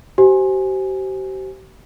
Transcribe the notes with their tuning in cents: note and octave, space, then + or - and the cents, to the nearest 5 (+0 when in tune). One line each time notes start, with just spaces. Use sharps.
G4 -40 C5 +0 G#5 +0